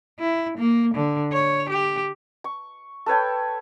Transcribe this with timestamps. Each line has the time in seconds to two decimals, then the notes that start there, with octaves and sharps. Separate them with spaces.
0.19 E4
0.58 A#3
0.95 D3
1.33 C#5
1.70 G4
2.44 C#6
3.06 A4 B4 C#5 G5